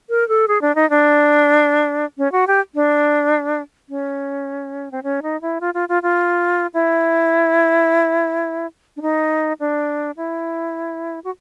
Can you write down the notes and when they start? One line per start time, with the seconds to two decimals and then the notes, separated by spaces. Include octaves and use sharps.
0.09 A#4
0.29 A4
0.48 G#4
0.62 D4
0.75 D#4
0.90 D4
2.18 C#4
2.32 F#4
2.48 G4
2.75 D4
3.89 C#4
4.92 C4
5.03 C#4
5.22 D#4
5.41 E4
5.61 F4
5.74 F4
5.89 F4
6.03 F4
6.74 E4
8.97 D4
9.02 D#4
9.60 D4
10.17 E4
11.24 F#4